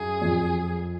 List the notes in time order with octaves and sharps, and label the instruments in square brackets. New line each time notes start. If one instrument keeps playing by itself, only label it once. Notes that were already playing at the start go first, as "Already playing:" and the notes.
Already playing: [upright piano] F#2 [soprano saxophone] G#4
[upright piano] F2